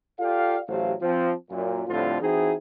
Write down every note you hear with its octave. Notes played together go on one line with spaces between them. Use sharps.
F4 G4 A4 D5 F5
A1 F#3 A3 G4 C5 F5
F3 C4
F#2 A#2
A2 D3 F3 G3 C4 F4
E3 C4 D#4 E4 F#4 G#4